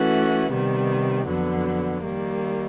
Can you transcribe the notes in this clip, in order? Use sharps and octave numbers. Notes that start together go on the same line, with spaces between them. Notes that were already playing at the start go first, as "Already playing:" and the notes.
Already playing: E3 A3 C#4 F#4
C3 D#3 G3 B3
F2 D3 F#3 B3
D#3 G3 A#3